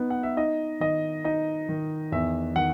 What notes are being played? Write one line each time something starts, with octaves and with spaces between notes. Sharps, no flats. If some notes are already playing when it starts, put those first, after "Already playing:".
Already playing: B3 D#4
F#5
E5
D#4 D#5
D#3 D#5
D#4 D#5
D#3
E2 E5
D#3 F#5